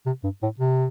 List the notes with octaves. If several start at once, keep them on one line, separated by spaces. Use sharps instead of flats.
C3
G2
A2
C3